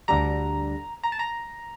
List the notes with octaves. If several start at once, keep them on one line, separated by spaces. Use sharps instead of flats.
D2 D3 G3 A#5
A#5
A5
A#5